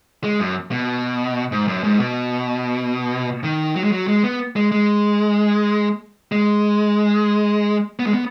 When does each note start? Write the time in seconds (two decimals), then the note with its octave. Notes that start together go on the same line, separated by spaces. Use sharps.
0.24 G#3
0.40 F#2
0.71 B2
1.52 G#2
1.68 F#2
1.83 G#2
1.99 B2
3.44 D#3
3.76 F#3
3.84 G#3
3.92 F#3
4.07 G#3
4.23 B3
4.56 G#3
4.72 G#3
6.32 G#3
7.99 B3
8.06 G#3
8.14 B3